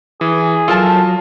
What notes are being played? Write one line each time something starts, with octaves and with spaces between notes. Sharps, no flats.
E3 G#4
F#3 F4 A4 A#4 A5